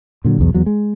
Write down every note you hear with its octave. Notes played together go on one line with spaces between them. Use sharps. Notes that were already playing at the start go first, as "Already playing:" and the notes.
A#2 D3 F#3
B1 E2
E2 F#3
G#3